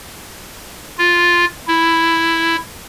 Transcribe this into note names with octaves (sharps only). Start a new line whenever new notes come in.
F4
E4